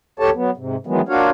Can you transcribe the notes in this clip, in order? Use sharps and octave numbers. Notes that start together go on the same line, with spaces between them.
D2 G4 A4 C#5 A5
F#3 B3
G#2 C3
D#3 E3 F#3 G#3 B3
A#3 D4 F4 F#4 C#5 F5